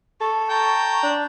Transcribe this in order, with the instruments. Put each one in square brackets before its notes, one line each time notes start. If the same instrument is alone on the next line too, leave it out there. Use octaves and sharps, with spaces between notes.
[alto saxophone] A4 [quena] C#6
[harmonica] G5 A5 A#5
[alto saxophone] D4